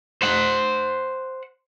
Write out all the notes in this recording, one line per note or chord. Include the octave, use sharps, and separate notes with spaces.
C5 F#5